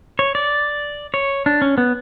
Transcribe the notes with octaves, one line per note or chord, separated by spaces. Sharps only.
C#5
D5
C#5
D4
C#4
B3